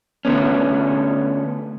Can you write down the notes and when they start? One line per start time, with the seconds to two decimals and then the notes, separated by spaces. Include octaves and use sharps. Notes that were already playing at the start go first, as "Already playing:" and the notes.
0.25 D3 A3 B3 C#4